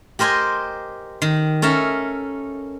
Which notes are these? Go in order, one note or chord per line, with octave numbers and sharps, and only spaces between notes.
G4 A#4 C5 D#5 G#5
D#3
C#4 A4 A#4 E5